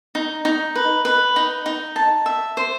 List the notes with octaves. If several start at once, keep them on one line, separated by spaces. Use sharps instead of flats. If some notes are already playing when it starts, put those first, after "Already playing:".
D#4
D#4
B4
B4
D#4
D#4
A5
E5
C5